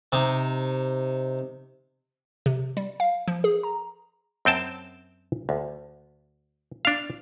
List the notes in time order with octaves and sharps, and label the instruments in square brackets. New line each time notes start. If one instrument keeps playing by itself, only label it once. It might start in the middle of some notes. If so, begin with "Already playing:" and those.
[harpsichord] C3 D#4
[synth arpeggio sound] C3
G3
F5
F3
G#4
A#5
[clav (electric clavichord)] F#2 C4 G5 A5
D2
D4 F5